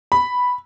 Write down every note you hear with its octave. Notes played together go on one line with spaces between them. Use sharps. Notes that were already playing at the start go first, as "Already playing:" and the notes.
B5